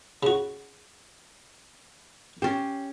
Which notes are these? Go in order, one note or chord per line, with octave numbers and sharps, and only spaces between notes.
C#3 F#4
C#4 G4 C5